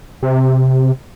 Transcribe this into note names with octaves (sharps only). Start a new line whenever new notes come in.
C3